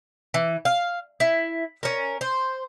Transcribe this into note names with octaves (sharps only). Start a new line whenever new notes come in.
E3
F5
E4
C#4 A#4
C5